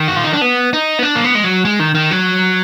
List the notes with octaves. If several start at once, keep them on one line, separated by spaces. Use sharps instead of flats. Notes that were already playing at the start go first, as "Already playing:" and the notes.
Already playing: D#3
F#4
F4
D#4
D4
B3
D#4
B3
D4
A#3
B3
G#3
F#3
G#3
D#3
D#3
F#3